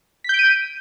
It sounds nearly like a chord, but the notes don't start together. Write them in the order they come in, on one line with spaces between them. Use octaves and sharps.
B6 G6 D7 D#7